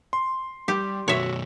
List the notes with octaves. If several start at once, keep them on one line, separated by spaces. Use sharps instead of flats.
C6
G3 G4
B1 F#2 F#4 C#5 E5